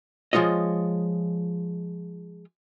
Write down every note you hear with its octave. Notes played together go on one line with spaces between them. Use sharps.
F3 G#3 F4 C#5 D#5